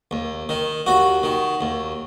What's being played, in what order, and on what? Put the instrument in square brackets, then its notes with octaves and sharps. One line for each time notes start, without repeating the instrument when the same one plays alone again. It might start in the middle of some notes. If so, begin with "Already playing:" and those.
[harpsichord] D#2
D#3
D#2 F#4
D#3
D#2